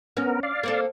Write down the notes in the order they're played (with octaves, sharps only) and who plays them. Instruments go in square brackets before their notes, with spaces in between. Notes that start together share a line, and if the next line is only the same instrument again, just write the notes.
[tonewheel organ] B3 A#4 [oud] C#4
[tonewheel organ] D5 F5
[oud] A#3 C4 A4